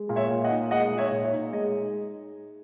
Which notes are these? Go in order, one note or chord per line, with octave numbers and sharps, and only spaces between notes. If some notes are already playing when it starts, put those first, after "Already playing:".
Already playing: G#3
A#2
C#5 E5
A#2
D#5 F#5
D#4
G#3 D#5 F#5
A#2
C#5 E5
A#2
C#5
D#4
G#3 D#5